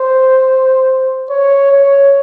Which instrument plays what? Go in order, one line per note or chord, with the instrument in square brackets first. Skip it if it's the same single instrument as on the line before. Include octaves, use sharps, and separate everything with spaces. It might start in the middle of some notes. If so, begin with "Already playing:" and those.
Already playing: [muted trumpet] C5
C#5
C#5